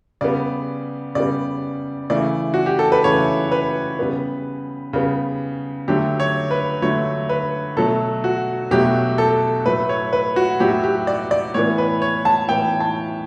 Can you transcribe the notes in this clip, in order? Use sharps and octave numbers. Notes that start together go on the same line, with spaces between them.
C#3 G3 B3 D5
C#3 G3 B3 D5
C#3 E3 A3 D5
F#4
G4
A4
B4
C#3 E3 A3 C#5
B4
C#3 G3 B3
C#3 G3 B3
D3 F#3 A3 G4
C#5
B4
D3 F#3 A3 C#5
B4
B2 F#3 A3 A4
F#4
B2 F#3 A3 G4
A4
A2 F#3 A3 B4
C#5
B4
F#4
A2 F#3 A3 G4
G4
D5
D5
A2 E3 B3 C#5
B4
C#5
A5
A2 E3 B3 G5
A5